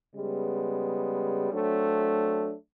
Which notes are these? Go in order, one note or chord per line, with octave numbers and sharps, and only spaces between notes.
C#3 G3 G#3 B3
F#3 A3 C4 D4